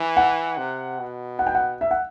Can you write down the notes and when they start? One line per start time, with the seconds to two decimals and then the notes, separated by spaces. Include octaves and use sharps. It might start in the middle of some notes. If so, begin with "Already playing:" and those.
Already playing: E3
0.17 F#5
0.57 C3
0.99 B2
1.39 F#5
1.47 G5
1.55 F#5
1.81 E5
1.91 F#5